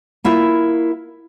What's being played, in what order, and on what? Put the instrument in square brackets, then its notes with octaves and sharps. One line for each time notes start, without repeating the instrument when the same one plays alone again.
[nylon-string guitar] A#3 E4 F4 E5